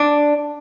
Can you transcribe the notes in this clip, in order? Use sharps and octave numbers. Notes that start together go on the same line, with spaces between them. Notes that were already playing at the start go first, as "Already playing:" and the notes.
Already playing: D4